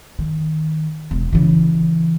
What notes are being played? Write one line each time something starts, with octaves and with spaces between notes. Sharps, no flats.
D#3
E1
C#3 E3